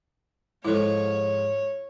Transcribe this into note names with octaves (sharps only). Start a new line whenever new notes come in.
G#2 F3 E4 A4 C#5